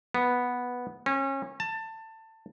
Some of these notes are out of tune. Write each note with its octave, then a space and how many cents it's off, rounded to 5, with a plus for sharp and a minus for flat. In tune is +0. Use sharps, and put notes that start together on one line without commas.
B3 -5
C#4 -30
A5 +20